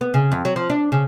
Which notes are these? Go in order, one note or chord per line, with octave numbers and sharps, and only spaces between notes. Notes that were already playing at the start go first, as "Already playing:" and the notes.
B3
C#3
F2
F#3
F3
D4
C#3